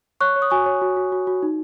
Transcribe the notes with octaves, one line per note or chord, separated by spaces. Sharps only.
C#5 C#6 F#6
C#5
D#6
F#4 G#5 C#6
C#5
F#4
F#4
F#4
F#4
D#4